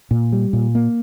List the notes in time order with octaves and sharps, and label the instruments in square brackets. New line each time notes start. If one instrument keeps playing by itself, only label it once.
[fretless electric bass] A#2
G3
A#2
A#3